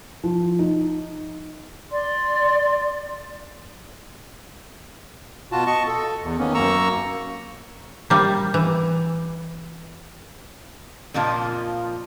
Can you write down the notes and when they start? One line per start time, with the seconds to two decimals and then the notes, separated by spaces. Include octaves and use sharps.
0.24 F3
0.59 D#4
1.91 D5 C6
5.52 B2 F4 F#4 A5
5.67 D#5 A5 C#6
5.87 A4
6.22 E2
6.39 D#3 A#3 B3 C#4
6.54 F#2 A#3 A#5 C#6 E6
8.10 G3 A#3
8.54 E3
11.14 F2 A#2 F3 A#3 F4